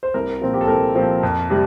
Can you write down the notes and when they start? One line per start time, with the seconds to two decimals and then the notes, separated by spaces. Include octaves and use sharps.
0.03 C5
0.14 C2 A#4
0.41 A#2 F3 C4
0.54 G4
0.61 A4
0.68 C2 A#4
0.95 A#2 F3 C4
1.23 F2
1.50 C3 G3